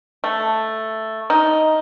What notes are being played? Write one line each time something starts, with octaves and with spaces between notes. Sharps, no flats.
A3
D#4